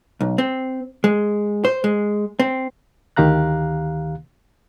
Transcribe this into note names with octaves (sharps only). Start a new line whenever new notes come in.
B1
C4
G#3
C5
G#3
C4
D2 D#3 G4 F5 A#5 F#6